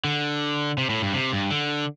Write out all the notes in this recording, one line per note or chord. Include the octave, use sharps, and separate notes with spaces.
D3
C3
A2
G2
C3
G2
D3